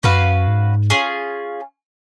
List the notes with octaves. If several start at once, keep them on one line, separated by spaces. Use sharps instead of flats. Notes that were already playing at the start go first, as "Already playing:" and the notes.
F#2 C#4 F#4 B4 F5
G#2
C#4 F4 G#4